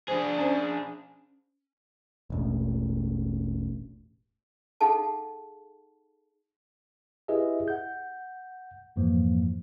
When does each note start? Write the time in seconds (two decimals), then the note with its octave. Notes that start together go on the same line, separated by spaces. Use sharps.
0.08 D4 G#4 C5
0.39 C#4 C5
2.30 E1 A1
4.81 D#4 G#4 A4 F5 F#5 A5
7.28 E4 G4 G#4 B4 D#5 E5
7.68 F#5 G6
8.96 F2 G#2 E3 F3 A#3